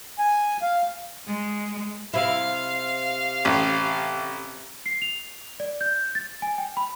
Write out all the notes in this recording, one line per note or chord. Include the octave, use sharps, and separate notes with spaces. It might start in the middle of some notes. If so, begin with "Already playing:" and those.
G#5
F5
G#3
C3 E4 F5
A1
C7
F7
D5
G6
A6
G#5
G5
B5